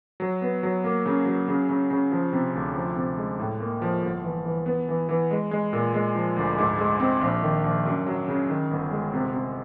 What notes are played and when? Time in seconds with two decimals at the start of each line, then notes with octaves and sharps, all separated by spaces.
0.20 F#3
0.42 B3
0.63 F#3
0.84 A#3
1.06 C#3
1.26 F#3
1.48 C#3
1.69 C#3
1.91 C#3
2.12 F3
2.33 C3
2.54 D2
2.75 F3
2.96 C3
3.17 G#3
3.39 A2
3.60 A#3
3.82 F3
4.03 G1
4.24 E3
4.45 E3
4.66 B3
4.88 E3
5.09 E3
5.31 G#3
5.51 G#3
5.73 A#2
5.94 G#3
6.15 F3
6.37 D2
6.58 G#2
6.79 G#3
7.00 C4
7.21 A#1
7.42 D#3
7.64 A#1
7.85 F#2
8.06 F#3
8.28 C#3
8.49 D#3
8.71 G1
8.91 G#3
9.14 C3
9.34 C3